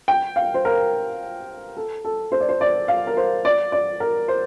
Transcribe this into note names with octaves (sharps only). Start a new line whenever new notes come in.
G5
F5
C5
A#4
A4
A4
C5
D5
C5
D5
F5
A#4
C5
D5
D5
A#4
C5